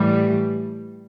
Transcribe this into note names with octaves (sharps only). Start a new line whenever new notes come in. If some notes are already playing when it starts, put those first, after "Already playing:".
Already playing: A2 E3 G3